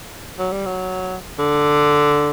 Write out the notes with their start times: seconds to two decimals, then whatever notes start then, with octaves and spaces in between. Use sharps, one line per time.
0.39 F#3
0.52 G3
0.66 F#3
1.39 D3